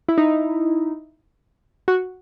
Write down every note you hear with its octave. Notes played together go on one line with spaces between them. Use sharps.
E4
D#4
F#4